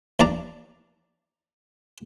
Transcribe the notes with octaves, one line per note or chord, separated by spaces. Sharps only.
D#2 D4 D5 A#5